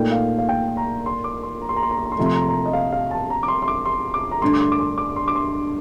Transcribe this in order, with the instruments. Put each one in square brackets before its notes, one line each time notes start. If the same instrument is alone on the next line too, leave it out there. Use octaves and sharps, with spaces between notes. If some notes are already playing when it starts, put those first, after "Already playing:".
Already playing: [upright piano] A#2 A3 D#4 [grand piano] G5
[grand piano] F5
F5
G5
A#5
C6
D6
C6
A#5
C6
A#5
C6
A#5
C6
A#5
C6
[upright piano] C3 F3 A3 [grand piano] A#5
[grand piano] C6
A#5
C6
A#5
D#5
F5
F5
A5
A#5
D6
C6
C6
D6
C6
D6
A#5
[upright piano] G2 D3 A3 [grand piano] C6
[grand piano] D6
C6
D6
C6
D6
C6
D6
C6